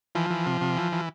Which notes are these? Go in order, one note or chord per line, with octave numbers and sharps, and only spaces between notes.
E3 F3
E3
C3
C3
E3
E3